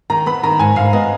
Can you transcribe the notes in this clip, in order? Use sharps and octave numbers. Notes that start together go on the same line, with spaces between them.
D#3 A#5
B3 B5
D#3 A#5
G#2 G#5
G#2 F5
B3 D#5